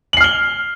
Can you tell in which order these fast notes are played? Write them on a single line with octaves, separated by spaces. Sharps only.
F#7 C7 F6 G7